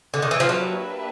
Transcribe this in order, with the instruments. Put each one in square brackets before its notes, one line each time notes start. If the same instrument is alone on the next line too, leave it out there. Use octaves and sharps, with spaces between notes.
[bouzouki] D3
D#3
E3
F3
[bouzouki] F#3 [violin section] A#3 D4 G4 B4 E5